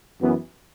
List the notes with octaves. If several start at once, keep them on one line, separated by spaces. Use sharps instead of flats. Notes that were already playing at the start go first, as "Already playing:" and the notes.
F#2 E3 B3